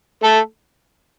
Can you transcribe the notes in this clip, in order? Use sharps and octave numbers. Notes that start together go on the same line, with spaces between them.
A3 A4